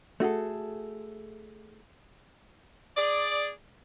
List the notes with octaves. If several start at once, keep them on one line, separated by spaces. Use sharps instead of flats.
A3 F#4 G#4 A4
G#4 D5